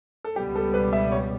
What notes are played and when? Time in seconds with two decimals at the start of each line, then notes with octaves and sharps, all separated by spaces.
0.25 A4
0.36 C#2 B2 G3 B3 G4
0.55 A4
0.74 B4
0.93 E5
1.12 C#5